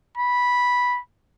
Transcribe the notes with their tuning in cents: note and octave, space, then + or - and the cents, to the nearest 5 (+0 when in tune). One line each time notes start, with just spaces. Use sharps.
B5 -10